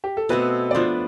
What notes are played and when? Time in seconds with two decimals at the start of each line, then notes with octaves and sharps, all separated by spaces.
0.04 G4
0.17 A4
0.29 B2 A3 C4 B4
0.71 D5
0.75 F3 B3 D4 C5